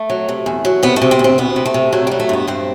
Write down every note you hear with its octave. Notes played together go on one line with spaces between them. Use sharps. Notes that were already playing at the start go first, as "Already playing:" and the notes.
Already playing: A3
F#3
C3
E2
F#3
C3 B3
A3
C3
C4
D2
C4
D2 B3
C3
A3
C3
F#3 A3
F#3 G3
A3
G2 B3
G2 C4